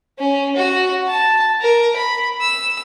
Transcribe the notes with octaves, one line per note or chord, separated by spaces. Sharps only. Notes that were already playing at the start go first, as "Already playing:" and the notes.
C#4
F#4
A5
A#4
B5
E6